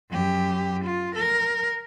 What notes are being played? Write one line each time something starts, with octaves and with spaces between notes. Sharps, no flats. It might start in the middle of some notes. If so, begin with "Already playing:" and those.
F#2 G4
F4
A#4